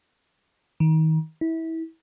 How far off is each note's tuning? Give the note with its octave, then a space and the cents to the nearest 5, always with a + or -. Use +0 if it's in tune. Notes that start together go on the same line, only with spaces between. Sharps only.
D#3 +30
E4 -25